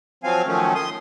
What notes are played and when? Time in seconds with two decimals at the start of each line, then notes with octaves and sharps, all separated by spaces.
0.24 F3 F#3 C4 F5 G#5
0.46 D#3 F3 F#3 A3 C#4
0.75 C6 D#6